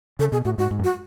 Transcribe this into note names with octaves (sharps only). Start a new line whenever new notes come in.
C#3 A4
B2 G#4
A2 F#4
G#2 F#4
G#2
F#2
F#4